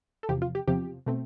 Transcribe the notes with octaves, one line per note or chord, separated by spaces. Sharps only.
A4
E2 C3 F3 G4
F4
G4
E2 C3 F3 G4
B2 A3 C4